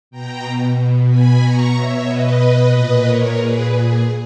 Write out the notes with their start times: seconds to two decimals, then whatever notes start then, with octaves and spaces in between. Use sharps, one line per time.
0.11 B2 G5 A#5
0.76 B2
1.08 G#5 B5
1.40 B2 A#5 C#6
1.73 C#5 E5
2.06 B2 B4 D#5
2.71 A#2
3.03 A#4 C#5
3.36 A#2 G#4 B4
3.68 G#4